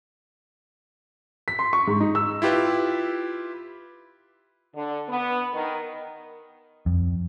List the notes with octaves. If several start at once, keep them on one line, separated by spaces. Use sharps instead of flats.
B6
C6
C#6
G#2
D#4
E6
E4 F4 G4 B4
D3
B3
D#3
F2